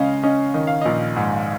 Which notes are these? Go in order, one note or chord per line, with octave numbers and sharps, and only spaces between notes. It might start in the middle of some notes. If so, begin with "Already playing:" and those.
Already playing: C#3 G#3 C#4 D#5 F5
C#4 D#5
D#3 D#5
F5
A#1 D#5
G#2